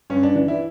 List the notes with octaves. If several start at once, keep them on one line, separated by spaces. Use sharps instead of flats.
G2 C#4
D4
E3 D4
E4